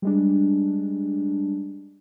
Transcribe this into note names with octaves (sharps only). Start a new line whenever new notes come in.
G3 G#3 D4